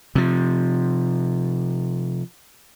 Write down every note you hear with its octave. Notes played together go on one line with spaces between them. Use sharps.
C3 F3